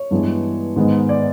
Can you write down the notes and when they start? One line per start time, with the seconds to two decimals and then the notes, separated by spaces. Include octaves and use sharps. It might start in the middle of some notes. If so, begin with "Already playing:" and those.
Already playing: C#5
0.11 G2 E3 G#3 B3 D4
0.76 G#2 D#3 G#3 B3
1.09 D5